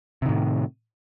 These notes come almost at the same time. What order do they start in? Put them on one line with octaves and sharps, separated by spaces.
C3 D#3 A2